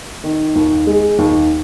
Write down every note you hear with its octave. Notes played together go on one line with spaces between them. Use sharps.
D#3
D#2
G#3
D#2